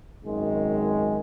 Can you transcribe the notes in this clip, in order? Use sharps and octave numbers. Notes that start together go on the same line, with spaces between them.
G#1 F#2 D#3 G#3